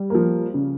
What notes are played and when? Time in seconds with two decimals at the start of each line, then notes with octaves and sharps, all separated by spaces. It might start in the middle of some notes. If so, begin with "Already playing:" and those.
Already playing: G3
0.10 F3 A#3
0.54 C#3